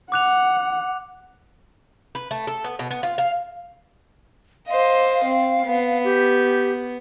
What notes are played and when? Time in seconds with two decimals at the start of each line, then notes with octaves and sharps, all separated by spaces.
0.12 F#5 D6 F#6 F7
2.15 B4
2.31 A3
2.47 A4
2.64 B3
2.79 B2
2.90 B3
3.03 F4
3.18 F5
4.68 C5 D#5 F5
5.24 C4
5.66 B3
6.04 G4